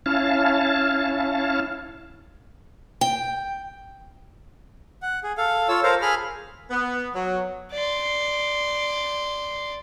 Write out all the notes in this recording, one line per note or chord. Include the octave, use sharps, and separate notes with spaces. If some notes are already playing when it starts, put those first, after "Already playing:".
C#4 E4 F5 A5
G5
F#5
G#4
A4 F5
F4 A4 C#5 E6
A4 A#4 C5 F5
G#4 B5 F6
B3
F#3
D5 C6